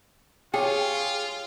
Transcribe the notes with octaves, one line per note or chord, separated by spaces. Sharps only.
F4 G4 G#4 C#5 G5